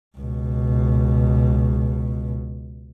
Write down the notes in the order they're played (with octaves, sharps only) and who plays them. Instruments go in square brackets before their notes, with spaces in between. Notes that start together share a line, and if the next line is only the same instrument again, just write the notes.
[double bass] C#2 B2